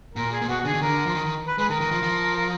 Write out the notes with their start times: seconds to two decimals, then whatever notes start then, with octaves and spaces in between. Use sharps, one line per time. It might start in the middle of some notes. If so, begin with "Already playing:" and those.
0.15 A#2 A#4
0.32 G#4
0.41 A#2
0.48 B2 F#4
0.60 F#4
0.65 D3 G#4
0.74 D#3
0.82 D3 A#4
1.06 F3
1.15 D#3
1.26 D#3
1.47 B4
1.58 G#3 B4
1.69 D#3 A#4
1.81 D#3
1.91 F3
2.03 F3
2.37 A#4